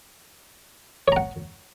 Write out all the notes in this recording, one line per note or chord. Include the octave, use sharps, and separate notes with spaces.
C#5 F#5 A#5